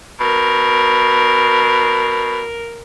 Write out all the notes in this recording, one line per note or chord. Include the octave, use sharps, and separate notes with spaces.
B2 A#4